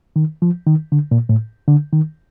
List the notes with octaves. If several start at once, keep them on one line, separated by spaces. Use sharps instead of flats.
D#3
F3
D#3
D3
A#2
A2
D3
D#3